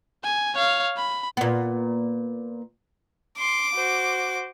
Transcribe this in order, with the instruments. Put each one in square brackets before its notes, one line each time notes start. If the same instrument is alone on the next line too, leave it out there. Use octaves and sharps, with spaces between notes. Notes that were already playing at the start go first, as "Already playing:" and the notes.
[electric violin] G#5
C#5 F5
B5
[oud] A#2 B3
[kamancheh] C6 [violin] D6
[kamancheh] F#4 C5